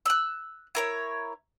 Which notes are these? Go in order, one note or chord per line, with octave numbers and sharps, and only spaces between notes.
E6 F#6
E4 A#4 C#5